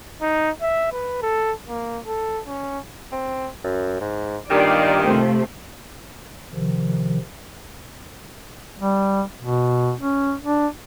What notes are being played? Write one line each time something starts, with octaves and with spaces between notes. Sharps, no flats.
D#4
E5
B4
A4
A#3
A4
C#4
C4
F#2
G#2
G2 A#2 D#3 G4 D5 F5
C3 F3 A3
C3 D#3 F3
G3
B2
C#4
D4